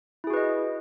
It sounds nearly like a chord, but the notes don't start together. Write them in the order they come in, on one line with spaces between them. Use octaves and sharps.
E4 G#4 F#4 B4 D#5